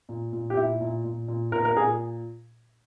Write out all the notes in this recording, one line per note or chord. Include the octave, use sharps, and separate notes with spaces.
A#2
A#2
G4
A#2 E4
A#2
A#2
A#2
A#2 A#4
A#4
A#2 G#4